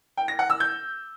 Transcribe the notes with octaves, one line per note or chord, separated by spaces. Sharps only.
G5
A#6
F#5
E6
G6